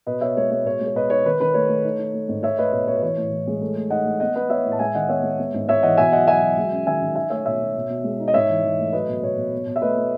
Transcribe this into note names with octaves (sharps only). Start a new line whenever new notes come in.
B2 B4 D#5
B2 C#5 E5
G#3 C#5
G#3 C#5
B2 C#5
G#3
C#5
B2 B4 D#5
D#4 C#5
D#3 B4
D#3 B4
A3 C#5
A3
D#4
D#4
A3
G#2
A3 C#5 E5
A3 B4 D#5
B2 C#5
B2 C#5
B4
E3 C#5
A2
E3
G#3
A3
A3
D#4 D#5 F#5
A3
B3 D#5 F#5
B3 B4 D#5
B3 C#5 E5
A2
A5
G#3 E5 G#5
D#3 D#5 F#5
B3 C#5 E5
G#3
B3
G#2
G#2 C#5 E5
E3 D#5 F#5
B2 E5 G#5
F#3 D#5 F#5
F#3 E5 G#5
F#3
G#3
C#4
D#3 E5 G#5
D#3
D#4 E5 G#5
A3 C#5 E5
B2 C#5 E5
B2
B2
B2
G#3
D#4
D#5
G#2 C#5 E5
E3
E3
A3
F#3 B4 D#5
B2
B2 C#5
B2
B2
B2
E5
A3 B4 D#5
A3